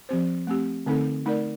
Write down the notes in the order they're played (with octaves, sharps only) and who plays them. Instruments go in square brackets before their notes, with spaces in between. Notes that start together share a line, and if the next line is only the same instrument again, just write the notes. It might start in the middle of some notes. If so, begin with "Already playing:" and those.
[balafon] F3 C4 G4 C5
A3 C4 G4
D3 A3 C4 D#4 A4
A3 D#4 A#4 D5